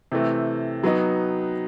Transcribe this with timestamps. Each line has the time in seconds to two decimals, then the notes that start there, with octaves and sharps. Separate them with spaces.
0.12 C3 E3 A3
0.83 F#3 B3 D#4